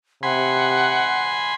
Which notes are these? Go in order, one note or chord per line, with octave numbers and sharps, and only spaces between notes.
C3 F#5 G#5 B5 C6